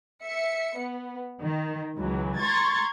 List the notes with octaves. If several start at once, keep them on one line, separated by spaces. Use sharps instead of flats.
E5 C#7
B3
D#3
C#2 E3 F#3
A#5 C6 C#6 G#6 A6